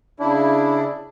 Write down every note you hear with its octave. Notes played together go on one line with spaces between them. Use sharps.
C#3 D4 E4